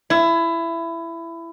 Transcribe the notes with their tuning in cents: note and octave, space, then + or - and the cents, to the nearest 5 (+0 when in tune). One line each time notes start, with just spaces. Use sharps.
E4 +20